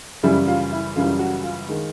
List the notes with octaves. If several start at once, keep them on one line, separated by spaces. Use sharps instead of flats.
F#2 C#3 E3 G3 E4
F4
E4
F#2 C#3 E3 G3 F4
F#4
F4
D#3 G#3